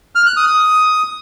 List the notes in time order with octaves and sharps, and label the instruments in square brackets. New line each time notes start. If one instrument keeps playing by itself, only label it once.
[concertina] F6
F#6
D#6
D#6